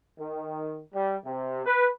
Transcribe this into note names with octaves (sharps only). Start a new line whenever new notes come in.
D#3
G3
C3
B4